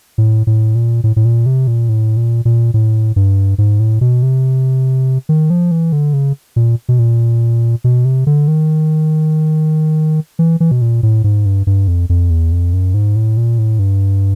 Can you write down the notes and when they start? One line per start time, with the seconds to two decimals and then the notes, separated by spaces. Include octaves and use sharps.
0.18 A2
0.47 A2
0.75 A#2
1.04 A2
1.16 A2
1.25 A#2
1.46 C3
1.67 A#2
1.89 A2
2.17 A#2
2.45 A#2
2.74 A2
3.16 G2
3.58 G#2
3.80 A2
4.01 B2
4.23 C3
5.29 D#3
5.50 F3
5.71 E3
5.92 D3
6.13 C#3
6.56 A#2
6.89 B2
6.99 A#2
7.84 B2
8.05 C3
8.27 D3
8.48 D#3
10.39 E3
10.60 E3
10.71 B2
10.82 A#2
11.03 A2
11.24 G#2
11.46 G2
11.67 G2
11.88 F2
12.10 F2
12.30 E2
12.52 F2
12.73 F#2
12.94 G#2
13.16 A2
13.37 A#2
13.58 A2
13.79 G2